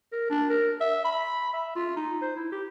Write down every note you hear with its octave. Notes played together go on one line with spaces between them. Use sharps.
A#4
D4
A#4
E5
B5
E5
F4
D#4
C5
E4
G4